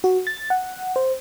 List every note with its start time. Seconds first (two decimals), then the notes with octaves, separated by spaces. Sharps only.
0.04 F#4
0.27 A6
0.50 F#5
0.96 C5